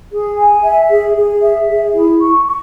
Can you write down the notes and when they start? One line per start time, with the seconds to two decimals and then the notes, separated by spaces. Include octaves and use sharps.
0.12 G#4
0.38 G#5
0.63 E5
0.90 G#4
1.16 G#4
1.42 E5
1.68 G#4
1.94 E4
2.20 C#6
2.46 C#6